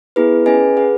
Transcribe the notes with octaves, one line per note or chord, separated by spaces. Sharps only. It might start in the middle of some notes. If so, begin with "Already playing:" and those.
B3 E4 G#4 B4
C#4 G#4 B4 D#5 G#5
G#4 B4 F#5